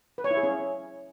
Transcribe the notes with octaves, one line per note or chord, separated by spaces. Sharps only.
B4
C#5
E4
G#4
C#4